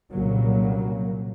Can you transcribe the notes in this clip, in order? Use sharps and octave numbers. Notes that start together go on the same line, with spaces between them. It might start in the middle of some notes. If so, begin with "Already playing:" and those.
C2 A#2 C#3 F#3 A#3